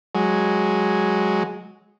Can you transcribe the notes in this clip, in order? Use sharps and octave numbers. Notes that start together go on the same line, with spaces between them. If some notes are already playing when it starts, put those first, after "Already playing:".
F#3 G#3